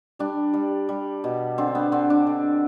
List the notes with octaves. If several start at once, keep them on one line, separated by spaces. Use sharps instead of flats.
G3 D4
G3
G3
B2
D3 C4
B3
D3 C4
D4
D3